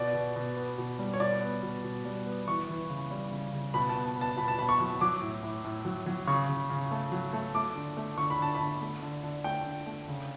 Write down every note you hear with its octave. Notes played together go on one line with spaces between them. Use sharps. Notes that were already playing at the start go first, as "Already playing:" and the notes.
Already playing: B2 D5
B2
B2
B3
B2
G3
C#5
B2 D5
B3
B2
B2
G3
B3
E3 C#6
E3
C#3
G3
C#3
C#3
B2 B5
A5
B3
B3
A5
B2 B5
A5
B2 B5
C#6
F#3
F#3 D6
A2
A2
A2
F#3
F#3
C#3 C#6
C#3
C#3
A3
F#3
A3
A3 D6
D3
A3
D3 C#6
B5
D3 A5
B5
D3
A3
D3
D3
A3 G5
D3
A3
C#3